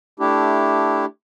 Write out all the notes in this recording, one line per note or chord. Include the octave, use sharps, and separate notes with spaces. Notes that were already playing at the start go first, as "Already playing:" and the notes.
A3 D4 E4 G4